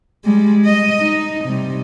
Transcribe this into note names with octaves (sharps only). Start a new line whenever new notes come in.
G3 G#3
D#5
D#4
C3 G3